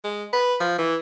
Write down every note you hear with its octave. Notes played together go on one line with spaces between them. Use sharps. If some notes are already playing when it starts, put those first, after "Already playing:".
G#3
B4
F3
E3